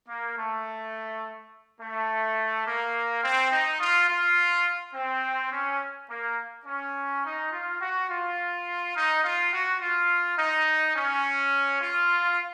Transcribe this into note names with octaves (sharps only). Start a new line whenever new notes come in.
A#3
A3
A3
A#3
C4
D#4
F4
F4
C4
C#4
A#3
C#4
D#4
F4
F#4
F4
D#4
F4
F#4
F4
D#4
C#4
F4